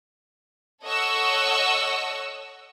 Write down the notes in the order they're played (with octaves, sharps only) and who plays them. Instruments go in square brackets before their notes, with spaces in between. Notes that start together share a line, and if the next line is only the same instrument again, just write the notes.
[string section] A4 C#5 D#5 F#5 C#6 E6